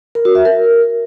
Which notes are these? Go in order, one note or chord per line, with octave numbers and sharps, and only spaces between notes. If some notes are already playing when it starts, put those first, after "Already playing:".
A#4
F#4
E5
A#4